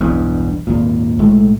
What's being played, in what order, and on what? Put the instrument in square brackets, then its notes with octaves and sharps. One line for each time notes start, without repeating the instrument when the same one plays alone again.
[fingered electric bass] E1 B1 E2 G2
G#1 D#2 A#2
B1 A2 G#3 A3